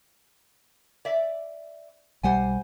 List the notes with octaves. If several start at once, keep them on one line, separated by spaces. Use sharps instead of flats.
D5 E5
B1 G3 C5 F#5 G#5